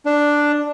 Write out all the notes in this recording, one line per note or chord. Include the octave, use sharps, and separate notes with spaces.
D4